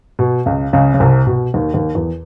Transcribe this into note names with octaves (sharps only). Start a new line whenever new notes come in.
B2
C#2 C#3
C#2 C#3
C#3
C2 C3
B2
D#2 D#3
D#2 D#3
E2 E3